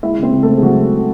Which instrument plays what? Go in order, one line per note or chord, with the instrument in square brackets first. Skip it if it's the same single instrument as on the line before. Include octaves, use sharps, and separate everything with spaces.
[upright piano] G#3 E4 E5
C#3
C4 C5
C#2
A3 A4
C#2
G#4
F#3 G#3 F#4